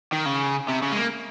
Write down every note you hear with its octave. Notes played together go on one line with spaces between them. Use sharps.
D#3
C#3
C3
C#3
G#3
A#3